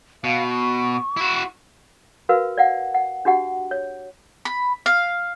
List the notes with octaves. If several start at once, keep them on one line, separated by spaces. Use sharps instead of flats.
B2 F5
C#6
E4 F#4
F#4 A#4 B4 F5
D5 F5 F#5
F#5
D4 F#4 G4 F#5
C#5
B5
F5